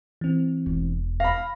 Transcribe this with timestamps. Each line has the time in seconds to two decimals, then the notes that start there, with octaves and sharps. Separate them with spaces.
0.21 E3 C4
0.66 E1
1.20 F5 B5 A#6